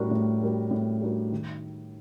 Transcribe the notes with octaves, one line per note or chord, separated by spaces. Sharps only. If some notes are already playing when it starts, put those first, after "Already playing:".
Already playing: A2 G3 D4 F#4 A#4
A2
G3 D4 F#4 A#4
A2
G3 D4 F#4 A#4
D#3